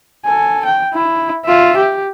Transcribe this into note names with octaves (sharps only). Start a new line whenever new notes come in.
A4 G#5
G5
E4
F4 E5
G4